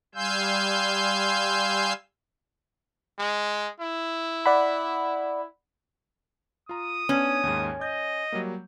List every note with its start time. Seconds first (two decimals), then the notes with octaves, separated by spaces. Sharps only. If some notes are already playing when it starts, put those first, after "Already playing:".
0.15 G3 F5 G#5 C6 E6 G6
3.19 G#3
3.80 E4
4.46 D5 F#5 B5
6.69 F4 A#5 D#6
7.09 B3 C#4 D4
7.43 D#2 G#2
7.81 D#5 G6
8.32 F#3 G3 A#3